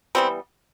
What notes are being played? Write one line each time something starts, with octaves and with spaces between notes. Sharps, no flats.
E3 G3 B3 C4